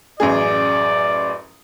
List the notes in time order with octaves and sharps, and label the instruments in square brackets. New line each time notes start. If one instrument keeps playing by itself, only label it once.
[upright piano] A1 F#2 G#4 [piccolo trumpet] D5